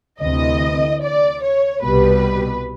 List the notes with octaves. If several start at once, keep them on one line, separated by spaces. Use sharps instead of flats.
D2 C3 E3 D#5
D5
C#5
C2 B2 G3 B4